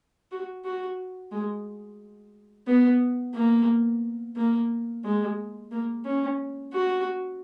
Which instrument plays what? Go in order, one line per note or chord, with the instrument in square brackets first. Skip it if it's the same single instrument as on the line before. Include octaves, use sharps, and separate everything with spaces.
[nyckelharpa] F#4
F#4
G#3
B3
A#3
A#3
G#3
A#3
C#4
F#4